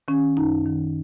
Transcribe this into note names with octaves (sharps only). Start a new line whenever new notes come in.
D#3 C#4
F#2 D#4
D#3